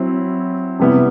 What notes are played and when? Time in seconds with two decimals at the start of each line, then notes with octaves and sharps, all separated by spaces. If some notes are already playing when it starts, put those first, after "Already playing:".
Already playing: F#3 C4 E4
0.79 C3 G3 B3 E4